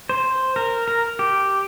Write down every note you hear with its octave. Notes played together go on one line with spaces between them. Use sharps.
C5
A#4
A#4
G4